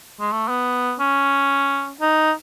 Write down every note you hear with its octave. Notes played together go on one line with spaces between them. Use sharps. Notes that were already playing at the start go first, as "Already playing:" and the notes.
G#3
A3
B3
C#4
D#4